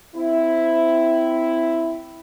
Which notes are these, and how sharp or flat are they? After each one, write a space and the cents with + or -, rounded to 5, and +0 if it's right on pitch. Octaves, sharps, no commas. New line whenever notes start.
C4 -20 E4 +0